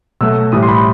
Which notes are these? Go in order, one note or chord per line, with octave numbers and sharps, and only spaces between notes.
B2 F#3 A3 E6
A2 E3 G3 D#6
C6
B5